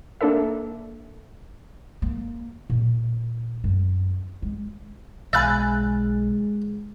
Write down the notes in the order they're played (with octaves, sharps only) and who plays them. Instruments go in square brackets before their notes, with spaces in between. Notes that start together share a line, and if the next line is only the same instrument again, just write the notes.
[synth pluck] A#3 D4 A4 A#4 E5
[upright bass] A#3
A#2
F#2
G#3
[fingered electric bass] B1 [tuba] G#3 [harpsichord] E5 F5 B5 [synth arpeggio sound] G#5 F#6 A6